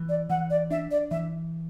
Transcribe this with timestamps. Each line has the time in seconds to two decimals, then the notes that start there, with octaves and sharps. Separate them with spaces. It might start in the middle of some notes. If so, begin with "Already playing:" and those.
Already playing: E3
0.09 D5
0.30 E3 F#5
0.50 D5
0.71 D4 E5
0.91 D5
1.11 E3 E5